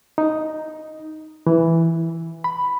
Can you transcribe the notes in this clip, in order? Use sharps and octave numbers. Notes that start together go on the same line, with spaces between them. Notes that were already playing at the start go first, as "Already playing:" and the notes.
D#4
E3
B5